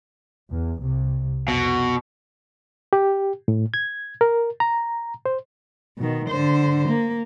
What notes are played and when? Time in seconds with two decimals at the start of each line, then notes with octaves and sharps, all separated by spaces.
0.51 E2
0.81 C2 C3
1.48 F2 B2
2.93 G4
3.48 A2
3.74 G#6
4.21 A#4
4.60 A#5
5.26 C5
5.97 B2 D#3
6.29 D3 C5
6.89 A#3